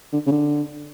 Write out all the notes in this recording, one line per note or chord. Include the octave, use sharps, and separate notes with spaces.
D3
C#3
D3